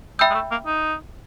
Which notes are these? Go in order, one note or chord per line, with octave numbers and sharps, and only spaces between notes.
G#3 E5 G5 B5 E6 G6
G#3
A3
A#3
D#4